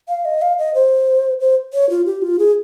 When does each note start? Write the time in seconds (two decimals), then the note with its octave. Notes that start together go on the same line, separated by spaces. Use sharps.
0.09 F5
0.25 D#5
0.42 F5
0.58 D#5
0.74 C5
1.40 C5
1.73 C#5
1.90 F4
2.06 G4
2.22 F4
2.39 G#4